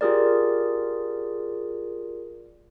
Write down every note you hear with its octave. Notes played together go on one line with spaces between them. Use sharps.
F4 G4 G#4 A#4 D5